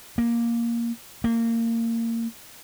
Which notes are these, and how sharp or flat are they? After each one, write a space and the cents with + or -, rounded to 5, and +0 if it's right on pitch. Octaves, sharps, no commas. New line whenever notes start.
A#3 +5
A#3 -25